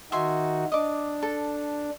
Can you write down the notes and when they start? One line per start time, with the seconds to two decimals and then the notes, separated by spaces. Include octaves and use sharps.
0.12 D#3 D#4 F#4 E5 G#5 C6
0.72 D4 D#5 D6
1.23 A4